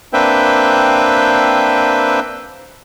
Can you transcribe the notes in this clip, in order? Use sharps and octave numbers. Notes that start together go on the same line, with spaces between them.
A#3 C4 D4 B4 E5 G5